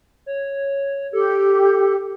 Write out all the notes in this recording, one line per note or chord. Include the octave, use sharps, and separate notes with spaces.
C#5
G4 A4